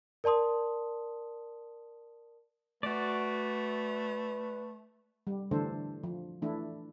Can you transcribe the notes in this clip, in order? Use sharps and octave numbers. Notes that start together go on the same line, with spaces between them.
A#4 D5 A5 C6 D#6
A3 F#4 B4 D5
G3
D3 E3 A3 D4 A4 C5
F3
E3 A3 D4 E4